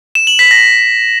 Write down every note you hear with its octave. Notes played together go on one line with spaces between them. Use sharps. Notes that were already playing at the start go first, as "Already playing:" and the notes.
E7
F#7
B6
A#6